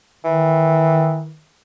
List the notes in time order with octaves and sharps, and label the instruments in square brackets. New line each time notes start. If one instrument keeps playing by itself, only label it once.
[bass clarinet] D#3 [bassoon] E3